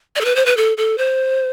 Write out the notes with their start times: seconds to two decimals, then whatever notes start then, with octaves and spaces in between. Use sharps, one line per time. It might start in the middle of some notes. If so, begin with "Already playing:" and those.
0.16 D5
0.21 A4
0.25 B4
0.36 C5
0.46 B4
0.57 A4
0.77 A4
0.98 C5